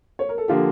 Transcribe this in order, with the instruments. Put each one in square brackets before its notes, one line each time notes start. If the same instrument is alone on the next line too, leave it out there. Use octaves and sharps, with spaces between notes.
[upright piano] C#5
A#4
A4
[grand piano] D3 F3 A#3 [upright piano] G4